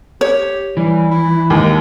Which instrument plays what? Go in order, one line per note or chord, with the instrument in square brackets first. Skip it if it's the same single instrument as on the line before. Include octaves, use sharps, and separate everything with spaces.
[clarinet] G4 [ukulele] C#5
[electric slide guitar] E3 [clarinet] G3
[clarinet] E4
[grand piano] D#2 [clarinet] G#3